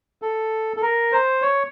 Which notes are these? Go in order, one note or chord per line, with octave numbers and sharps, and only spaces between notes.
A4
A4
A#4
C5
C#5